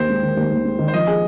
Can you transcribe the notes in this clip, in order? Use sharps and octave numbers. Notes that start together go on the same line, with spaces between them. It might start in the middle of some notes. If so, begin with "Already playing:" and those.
Already playing: D#2 C5
G#3
D#3
D#2
D#2
G#3
D#3
C5
F3 D#5
G#4